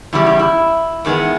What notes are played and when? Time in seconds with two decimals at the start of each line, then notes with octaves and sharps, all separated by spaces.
0.13 E2 C#3 G3 E4
0.26 G4
0.39 E4
1.05 E2 D#3 G#3 B3